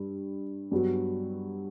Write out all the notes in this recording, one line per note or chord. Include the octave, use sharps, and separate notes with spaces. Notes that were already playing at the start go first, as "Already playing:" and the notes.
Already playing: G2
G2 F#3 B3 F#4